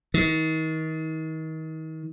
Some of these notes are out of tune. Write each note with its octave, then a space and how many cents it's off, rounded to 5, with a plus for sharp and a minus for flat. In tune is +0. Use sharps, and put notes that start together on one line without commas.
D#3 +35